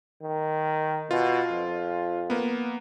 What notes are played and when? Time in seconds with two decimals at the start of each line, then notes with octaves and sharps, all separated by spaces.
0.23 D#3
1.11 B2 F4
1.51 F2
2.30 A#3 B3